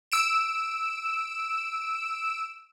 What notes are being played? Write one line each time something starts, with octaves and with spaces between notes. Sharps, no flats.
E6 D7 E7